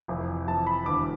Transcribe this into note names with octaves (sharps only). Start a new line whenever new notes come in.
F1 F2 E3
F1 F2 E3 A5
B5
E1 E2 D3 D6